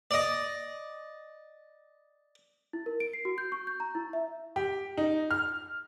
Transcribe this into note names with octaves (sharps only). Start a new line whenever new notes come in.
D5 D#5
E4
A#4
D7
C7
F#4
G6
C#6
G6
A#5
E4
E5
G4
D#4
F6